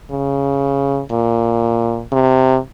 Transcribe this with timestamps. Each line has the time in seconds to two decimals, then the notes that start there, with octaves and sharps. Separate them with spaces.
0.11 C#3
1.11 A#2
2.12 C3